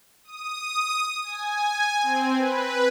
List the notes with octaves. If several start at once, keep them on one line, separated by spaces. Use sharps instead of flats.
D#6
G#5
C4
B4